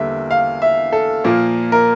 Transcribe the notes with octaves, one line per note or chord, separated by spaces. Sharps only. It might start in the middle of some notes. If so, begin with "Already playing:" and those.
Already playing: E2 D3 G3 A#3 E5
F5
E5
A4
A#2 F3 A#3
A#4